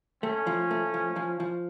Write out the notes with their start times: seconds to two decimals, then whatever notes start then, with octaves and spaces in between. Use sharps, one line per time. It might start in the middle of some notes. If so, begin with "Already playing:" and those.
0.23 A3 C#4
0.47 F3
0.71 A3
0.94 F3
1.16 F3
1.40 F3